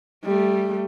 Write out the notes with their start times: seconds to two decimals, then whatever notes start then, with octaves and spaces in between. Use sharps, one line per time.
0.24 G3 A3